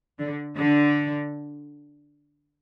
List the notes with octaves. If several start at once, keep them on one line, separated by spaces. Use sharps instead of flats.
D3
D3